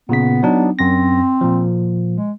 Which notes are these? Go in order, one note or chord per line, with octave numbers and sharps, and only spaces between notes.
A#2 C#3 B3 B6
F#3 D4 D#4
F#2 C4 A#6
A#2 F3
G#3